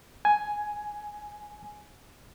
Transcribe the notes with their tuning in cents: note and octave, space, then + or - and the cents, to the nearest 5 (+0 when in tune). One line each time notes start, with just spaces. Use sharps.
G#5 +5